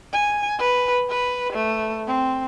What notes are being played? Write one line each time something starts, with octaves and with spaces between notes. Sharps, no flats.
G#5
B4
B4
A3
C4